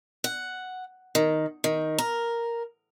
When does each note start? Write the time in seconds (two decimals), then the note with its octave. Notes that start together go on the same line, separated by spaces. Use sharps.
0.24 F#5
1.15 D#3
1.64 D#3
1.98 A#4